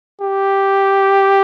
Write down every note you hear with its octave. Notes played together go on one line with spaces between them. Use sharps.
G4